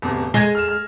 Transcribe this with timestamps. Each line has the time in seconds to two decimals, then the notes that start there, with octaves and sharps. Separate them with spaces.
0.02 D1 E2 C3
0.34 G#3 G#6 A#6 G7
0.55 F6 E7
0.68 F6